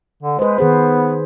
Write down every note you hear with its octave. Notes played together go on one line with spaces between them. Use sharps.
D3
G#3 B4 C5
D#3 B3 G#4 C5